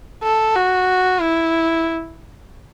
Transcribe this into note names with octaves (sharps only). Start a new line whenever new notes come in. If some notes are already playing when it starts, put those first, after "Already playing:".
A4
F#4
E4